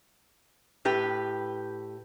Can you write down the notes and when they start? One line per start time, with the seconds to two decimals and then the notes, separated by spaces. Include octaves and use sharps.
0.85 A2 G4 B4